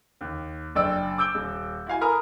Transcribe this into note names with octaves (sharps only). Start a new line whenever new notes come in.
D#2
F#1 D4 D5 G5 E6
D6 E6 G6 D7 G7
D#1
E4 F#4 F5 G#5
A#4 G#5 A#5 B5 D#6 F6